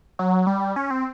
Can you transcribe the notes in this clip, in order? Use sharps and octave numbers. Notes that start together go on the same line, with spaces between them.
F#3
G3
C#4
C4